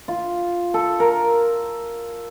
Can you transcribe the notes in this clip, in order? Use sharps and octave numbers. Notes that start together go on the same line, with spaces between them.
F4
A4
A#4